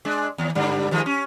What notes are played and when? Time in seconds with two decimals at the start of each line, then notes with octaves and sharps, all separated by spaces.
0.05 G#3 D4
0.38 D#2
0.55 G2 D3 G3
0.91 D#3 F3 G#3
1.06 C#4